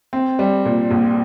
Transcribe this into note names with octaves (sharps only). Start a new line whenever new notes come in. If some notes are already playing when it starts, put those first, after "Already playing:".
C4
G3
A#2
A#1